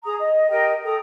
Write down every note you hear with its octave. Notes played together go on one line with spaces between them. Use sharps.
G#4 A#5 D#6
D#5
G4 A#4 D#5 G5
A4 G5 A#5 D#6